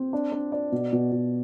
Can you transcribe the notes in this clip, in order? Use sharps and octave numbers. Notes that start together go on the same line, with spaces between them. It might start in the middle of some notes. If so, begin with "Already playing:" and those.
Already playing: C4
D4
D4
D5
B2
B2
B2